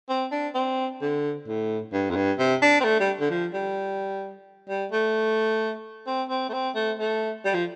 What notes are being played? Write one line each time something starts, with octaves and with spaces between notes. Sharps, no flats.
C4
D4
C4
D3
A2
G2
F2
G2
C3
D4
C4
A3
G3
D3
F3
G3
G3
A3
C4
C4
A3
C4
A3
A3
G3
F3